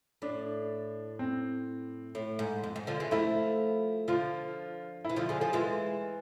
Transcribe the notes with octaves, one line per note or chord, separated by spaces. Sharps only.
A2 D4
C4
A2
G#2
F2
G#2
D3 F3
E3 G#3
F3 A3 E4
D3 F3 F4
E3 E4
D3 F3 F4
D3 F3 G#4
F3 A3 G#4
E3 G#3 F4